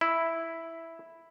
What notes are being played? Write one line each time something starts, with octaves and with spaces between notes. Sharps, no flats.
E4